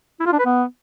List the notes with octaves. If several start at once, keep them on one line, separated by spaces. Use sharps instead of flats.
E4
F4
D4
B4
B3